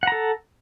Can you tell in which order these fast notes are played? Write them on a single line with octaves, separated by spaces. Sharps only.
F#5 A#5 A4